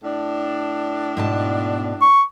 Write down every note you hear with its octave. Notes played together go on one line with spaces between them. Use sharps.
A2 D4
G#2 B2 A5
C#6